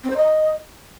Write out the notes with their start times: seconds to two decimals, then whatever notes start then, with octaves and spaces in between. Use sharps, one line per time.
0.03 C4
0.10 C5
0.16 D#5